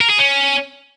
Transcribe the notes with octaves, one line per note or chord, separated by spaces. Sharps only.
A#4
G#4
C#4